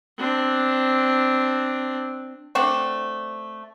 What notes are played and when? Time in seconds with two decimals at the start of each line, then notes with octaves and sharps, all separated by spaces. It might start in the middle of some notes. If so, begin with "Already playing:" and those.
0.18 C4 D4
2.55 A3 C4 D4 F#5